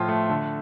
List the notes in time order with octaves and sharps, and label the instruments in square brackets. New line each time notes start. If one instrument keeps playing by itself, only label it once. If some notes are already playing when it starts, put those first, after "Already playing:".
Already playing: [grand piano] A2 F3 F4
A3
D3